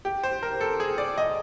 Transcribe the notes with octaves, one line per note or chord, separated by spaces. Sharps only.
G4
C5
A#4
A4
G#4
D5
D#5